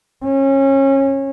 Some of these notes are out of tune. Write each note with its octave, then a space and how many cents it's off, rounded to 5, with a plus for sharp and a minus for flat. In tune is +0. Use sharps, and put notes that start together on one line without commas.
C#4 -25